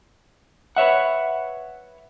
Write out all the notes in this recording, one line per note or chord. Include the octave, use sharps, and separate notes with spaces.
B4 C#5 E5 F#5